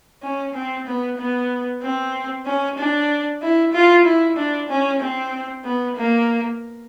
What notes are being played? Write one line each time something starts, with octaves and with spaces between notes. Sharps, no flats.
C#4
C4
B3
B3
C4
C#4
D4
E4
F4
E4
D4
C#4
C4
B3
A#3